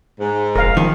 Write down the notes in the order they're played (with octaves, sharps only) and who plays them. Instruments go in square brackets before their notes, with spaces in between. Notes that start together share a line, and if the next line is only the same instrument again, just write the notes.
[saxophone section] G#2
[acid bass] F1 [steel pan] A#4 F5
[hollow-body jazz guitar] D#3 [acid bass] F3